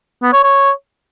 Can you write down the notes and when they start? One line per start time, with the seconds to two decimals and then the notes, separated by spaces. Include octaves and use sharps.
0.22 B3
0.33 C#5
0.43 C#5